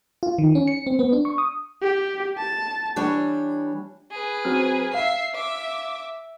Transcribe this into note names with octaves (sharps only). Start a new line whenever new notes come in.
F4
D#3
C#4
C#7
C4
B3
D4
C#6
D#6
G4
A5
E3 G3 D4 C#5
G#4 B4
F#3 C4 F6
E5 F5 C7
E5 D6